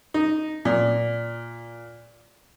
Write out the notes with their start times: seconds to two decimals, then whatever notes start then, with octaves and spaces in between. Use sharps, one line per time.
0.14 D#4
0.65 A#2